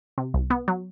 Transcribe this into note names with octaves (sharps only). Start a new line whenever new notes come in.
C3
C2
B3
F#3